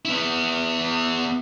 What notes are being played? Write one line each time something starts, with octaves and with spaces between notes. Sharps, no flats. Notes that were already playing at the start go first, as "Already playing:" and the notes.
B3 E4